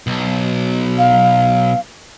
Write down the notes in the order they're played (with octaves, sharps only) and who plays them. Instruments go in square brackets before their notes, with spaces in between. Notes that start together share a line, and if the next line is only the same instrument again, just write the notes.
[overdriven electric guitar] B1
[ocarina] F5